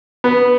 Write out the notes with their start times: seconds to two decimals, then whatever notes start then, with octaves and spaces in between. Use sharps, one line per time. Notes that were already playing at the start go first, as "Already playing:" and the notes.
0.24 B3